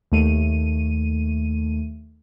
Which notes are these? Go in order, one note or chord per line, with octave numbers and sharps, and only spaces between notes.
D#2 A3 D#7